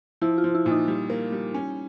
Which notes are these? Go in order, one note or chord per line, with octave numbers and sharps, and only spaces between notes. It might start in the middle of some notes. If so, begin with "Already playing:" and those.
F3 E4
F4
F3
E4
A#2 E4
D#4
G3
A#3
G3
C#4